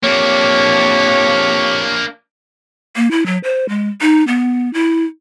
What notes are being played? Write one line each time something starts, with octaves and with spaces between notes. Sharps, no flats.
F2 A#3 D4 G4 C#5
A#3
E4
F#3
C5
G#3
D#4
B3
E4